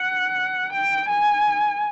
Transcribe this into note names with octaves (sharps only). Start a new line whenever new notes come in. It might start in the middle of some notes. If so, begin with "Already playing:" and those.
Already playing: F#5
G5
G#5